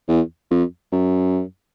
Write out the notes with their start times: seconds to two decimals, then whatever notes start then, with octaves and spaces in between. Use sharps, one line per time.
0.08 E2
0.51 F2
0.92 F#2